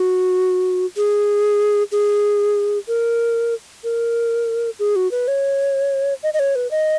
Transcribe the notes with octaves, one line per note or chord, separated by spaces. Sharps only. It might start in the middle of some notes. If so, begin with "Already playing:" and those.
Already playing: F#4
G#4
G#4
A#4
A#4
G#4
F#4
B4
C#5
D#5
D#5
C#5
B4
D#5